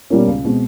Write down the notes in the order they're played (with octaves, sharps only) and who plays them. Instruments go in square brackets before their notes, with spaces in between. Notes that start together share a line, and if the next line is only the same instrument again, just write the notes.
[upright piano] B2 G3 A#3 C#4
C#2
B2 G#3 C4